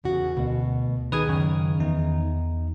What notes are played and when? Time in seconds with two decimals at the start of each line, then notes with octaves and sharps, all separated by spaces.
0.04 E2 C#3 F#4
0.37 D2 B2
1.12 D#3 G#4 B4 D#6 G#6
1.29 F#2 C#3
1.80 E2 D#4